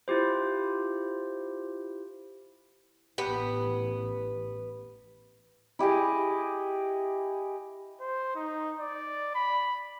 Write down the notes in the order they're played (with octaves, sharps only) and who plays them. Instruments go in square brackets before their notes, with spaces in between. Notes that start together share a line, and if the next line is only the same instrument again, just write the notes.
[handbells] E4 F4 G4 C5
[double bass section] A1 E3 [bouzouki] B3 [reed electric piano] G4 B4
[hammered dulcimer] E4 G4 G#4 D#5
[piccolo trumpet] C5
D#4
D5
B5